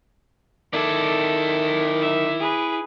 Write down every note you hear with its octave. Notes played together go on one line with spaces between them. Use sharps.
D#3 E4 A4 D5
E5
G#4 B4